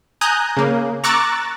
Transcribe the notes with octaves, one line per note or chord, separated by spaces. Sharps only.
G#5 A#5 D#6 F#6 G6
C#3 A#3
A#5 C#6 D6 E6 F#6 A6